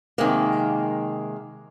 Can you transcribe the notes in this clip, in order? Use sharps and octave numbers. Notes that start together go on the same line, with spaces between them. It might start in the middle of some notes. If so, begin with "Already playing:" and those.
C3 D#3 G#3 A#3